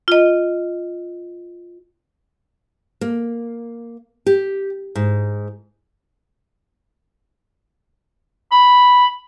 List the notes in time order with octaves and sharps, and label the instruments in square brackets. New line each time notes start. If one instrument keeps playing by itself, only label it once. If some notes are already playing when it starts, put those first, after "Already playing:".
[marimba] F4 D#5
[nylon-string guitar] A#3
G4
G#2
[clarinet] B5